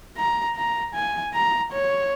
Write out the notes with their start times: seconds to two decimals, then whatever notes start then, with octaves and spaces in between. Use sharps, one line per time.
0.17 A#5
0.56 A#5
0.94 G#5
1.34 A#5
1.72 C#5